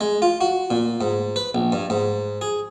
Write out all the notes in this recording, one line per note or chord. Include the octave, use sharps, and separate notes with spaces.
G#3
F4
F#4
A#2
G#2
B4
A#1
G2
G#2
G#4